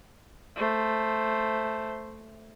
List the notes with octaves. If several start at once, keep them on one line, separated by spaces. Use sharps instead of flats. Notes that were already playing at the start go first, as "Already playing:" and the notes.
A3 C5